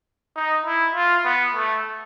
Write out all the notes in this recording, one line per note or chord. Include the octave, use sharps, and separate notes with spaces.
D#4
E4
F4
B3
A3